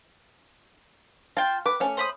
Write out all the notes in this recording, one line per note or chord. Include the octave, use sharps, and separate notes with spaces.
F4 F5 G5 A5
B4 D6
A3 C#4
C5 B5 D#6